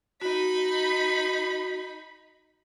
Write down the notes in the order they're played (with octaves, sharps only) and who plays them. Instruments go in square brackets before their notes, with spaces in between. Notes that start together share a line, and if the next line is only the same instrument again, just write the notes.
[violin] D#4 B5 [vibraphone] F#4